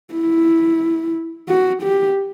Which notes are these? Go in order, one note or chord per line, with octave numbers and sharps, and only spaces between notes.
E4
F#4
G4